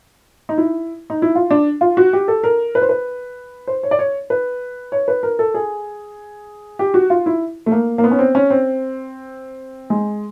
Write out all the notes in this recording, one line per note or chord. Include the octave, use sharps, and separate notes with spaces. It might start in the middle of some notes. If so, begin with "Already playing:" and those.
D#4
E4
D#4
E4
F4
D4
F4
F#4
G4
A4
A#4
B4
C5
B4
C5
C#5
D5
C#5
B4
C#5
B4
A#4
A4
G#4
G4
F#4
F4
E4
A3
A#3
A#3
B3
C#4
C4
C#4
C4
G#3